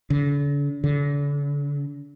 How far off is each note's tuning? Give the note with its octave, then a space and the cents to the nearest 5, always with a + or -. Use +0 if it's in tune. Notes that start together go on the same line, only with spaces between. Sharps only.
D3 -40
D3 -40